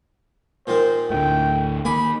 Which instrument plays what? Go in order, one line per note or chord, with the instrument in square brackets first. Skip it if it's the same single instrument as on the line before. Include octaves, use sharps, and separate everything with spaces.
[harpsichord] A#2 D#3 A#3 [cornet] C5
[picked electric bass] D2 A2 [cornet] G5
[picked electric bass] D#3 A#3 [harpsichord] G#4 D6 [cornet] B5